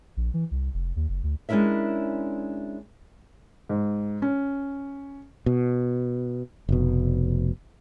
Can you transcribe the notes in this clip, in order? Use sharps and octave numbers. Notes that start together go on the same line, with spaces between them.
A#1
E3
C2
F1
D#2
F#1
D2
G#3 C#4 D4 E4 A#4 E5
G#2
C#4
B2
F1 B2